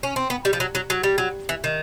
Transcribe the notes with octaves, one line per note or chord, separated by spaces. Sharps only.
C#4
C4
B3
G3
F3
F#3
F#3
F#3
G3
F#3
E3
D#3